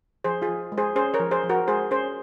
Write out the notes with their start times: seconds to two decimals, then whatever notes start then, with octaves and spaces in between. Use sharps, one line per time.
0.24 F3 G#4 C5
0.42 F4 G#4
0.48 F3
0.72 G#3
0.77 G#4 C5
0.96 C#4 G#4 C5
1.14 A#4 C#5
1.19 F3
1.31 G#4 C5
1.43 F3
1.49 F#4 A#4
1.68 G#3 G#4 C5
1.91 C#4 G#4 C5